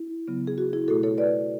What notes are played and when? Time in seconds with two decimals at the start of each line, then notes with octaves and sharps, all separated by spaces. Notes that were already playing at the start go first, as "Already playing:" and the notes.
Already playing: E4
0.28 C#3 F#3 B3
0.47 G#4
0.58 F#4
0.73 E4 G#4
0.88 B2 A3 F#4 A4
1.03 A4 C#5
1.18 B4 D5